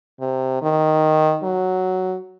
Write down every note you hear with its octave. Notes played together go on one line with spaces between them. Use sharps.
C3
D#3
F#3